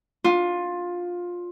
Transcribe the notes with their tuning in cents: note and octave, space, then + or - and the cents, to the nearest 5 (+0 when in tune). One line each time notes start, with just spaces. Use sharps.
D4 +0 F4 +15